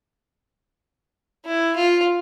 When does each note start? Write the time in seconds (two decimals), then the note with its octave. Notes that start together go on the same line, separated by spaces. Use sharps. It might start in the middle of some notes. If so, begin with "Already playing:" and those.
1.46 E4
1.76 F4